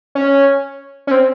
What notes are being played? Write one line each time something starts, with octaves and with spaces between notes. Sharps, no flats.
C#4
C#4
C4